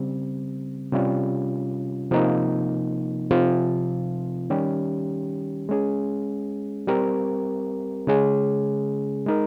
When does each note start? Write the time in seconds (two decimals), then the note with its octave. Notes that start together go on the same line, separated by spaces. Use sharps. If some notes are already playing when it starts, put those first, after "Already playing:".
Already playing: C#3 G3 C4
0.92 C3 G3 C#4 F4
2.11 C3 F3 A#3 D#4
3.31 C3 F3 C4 F4
4.50 D#3 G3 C#4 G4
5.69 G#3 C#4 G#4
6.88 G3 C4 G4 A#4
8.07 C#3 G#3 C#4 G#4
9.26 G#3 D#4 A#4